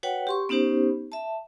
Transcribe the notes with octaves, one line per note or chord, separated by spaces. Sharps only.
F#4 B4 C#5 F#5 G5
G4 C6 C#6
B3 C#4 D#4 G4 C5
E5 A5